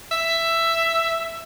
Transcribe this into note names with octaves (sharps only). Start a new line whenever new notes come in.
E5